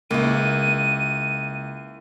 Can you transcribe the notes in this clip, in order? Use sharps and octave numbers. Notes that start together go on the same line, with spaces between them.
C#2 A#3 E4 D#7